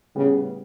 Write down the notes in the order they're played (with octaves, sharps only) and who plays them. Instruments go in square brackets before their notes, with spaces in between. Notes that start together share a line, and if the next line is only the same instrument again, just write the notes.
[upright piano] A2 G3 B3 [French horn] C#3